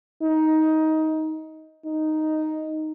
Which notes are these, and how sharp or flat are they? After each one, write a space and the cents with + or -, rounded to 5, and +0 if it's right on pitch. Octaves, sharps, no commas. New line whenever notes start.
D#4 +15
D#4 +0